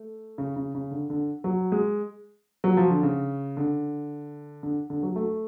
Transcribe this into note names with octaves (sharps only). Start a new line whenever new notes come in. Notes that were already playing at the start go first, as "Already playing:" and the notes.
Already playing: A3
C#3
C#3
C#3
D3
D3
F#3
G#3
F#3
F3
D3
C#3
D3
D3
D3
F#3
A3